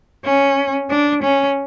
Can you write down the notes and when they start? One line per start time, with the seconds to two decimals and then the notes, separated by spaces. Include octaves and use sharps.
0.25 C#4
0.90 D4
1.23 C#4